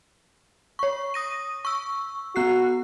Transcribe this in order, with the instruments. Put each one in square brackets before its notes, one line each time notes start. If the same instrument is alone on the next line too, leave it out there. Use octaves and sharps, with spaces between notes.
[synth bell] C#5 C#6
D#6 A#6 D#7
C#6 E6
[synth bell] B3 F#6 C7 [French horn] F#4